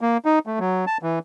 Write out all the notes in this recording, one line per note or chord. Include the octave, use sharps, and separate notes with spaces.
A#3
D#4
A3
F#3
A5
E3